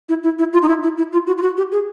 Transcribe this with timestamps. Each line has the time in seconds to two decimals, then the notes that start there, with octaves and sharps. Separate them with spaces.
0.09 E4
0.23 E4
0.39 E4
0.53 F4
0.62 D#4
0.68 E4
0.83 E4
0.98 E4
1.12 F4
1.27 F#4
1.38 F4
1.42 F#4
1.57 G4
1.72 G#4